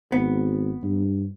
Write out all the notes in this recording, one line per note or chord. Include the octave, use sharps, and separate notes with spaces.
G#1 B3
G2